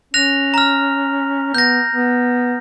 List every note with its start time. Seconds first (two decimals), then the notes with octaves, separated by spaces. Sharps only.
0.14 C#4 F#6 A#6 F7
0.54 A#5 F6
1.54 B3 G6 A#6
1.93 B3